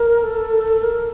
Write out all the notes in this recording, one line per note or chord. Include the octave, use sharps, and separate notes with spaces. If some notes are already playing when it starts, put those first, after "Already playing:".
Already playing: A#4
A4
A#4